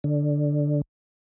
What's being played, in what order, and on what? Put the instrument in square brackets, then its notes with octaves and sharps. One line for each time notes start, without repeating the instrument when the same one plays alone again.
[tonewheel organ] D3